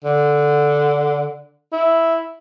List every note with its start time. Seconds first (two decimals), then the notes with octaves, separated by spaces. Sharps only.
0.04 D3
1.73 E4